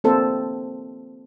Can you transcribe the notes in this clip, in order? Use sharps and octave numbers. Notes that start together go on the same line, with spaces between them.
A#3 C4 A4 C5